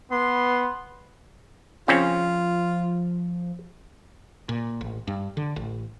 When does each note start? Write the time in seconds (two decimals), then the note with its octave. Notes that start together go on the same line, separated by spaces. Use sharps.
0.11 B3 C6
1.88 C#3 F3 C4 C#4 F4
4.49 A#2
4.81 A1
5.07 G2
5.37 D3
5.56 A1